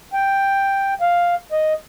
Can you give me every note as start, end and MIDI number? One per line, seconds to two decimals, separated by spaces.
0.13 0.94 79
1.01 1.35 77
1.52 1.73 75